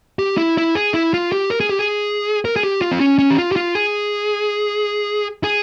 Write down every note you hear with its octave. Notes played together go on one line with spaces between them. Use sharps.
G4
E4
E4
G#4
E4
F4
G4
A#4
G#4
G4
G#4
A#4
G#4
G4
F4
C4
C#4
C#4
G4
F4
G4
F4
G#4
G#4